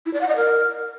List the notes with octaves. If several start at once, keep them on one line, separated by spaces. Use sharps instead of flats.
E4
D5
F#5
D#5
A#4